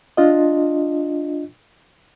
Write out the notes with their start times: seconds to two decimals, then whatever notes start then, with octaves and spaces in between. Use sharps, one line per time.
0.17 D4 F4 D#5